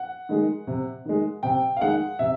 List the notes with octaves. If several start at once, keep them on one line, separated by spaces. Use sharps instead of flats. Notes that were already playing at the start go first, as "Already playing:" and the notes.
Already playing: F#5
D#3 G#3
C3
D#3 G#3
C3 G5
F5
D#3 G#3 F#5
C3 E5